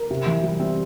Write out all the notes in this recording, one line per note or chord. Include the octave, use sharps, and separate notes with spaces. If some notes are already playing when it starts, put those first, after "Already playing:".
Already playing: A#4
C3
E3
G3
C4